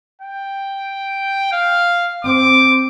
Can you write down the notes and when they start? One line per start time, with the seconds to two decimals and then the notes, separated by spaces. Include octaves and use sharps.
0.22 G5
1.52 F5
2.25 C4 D6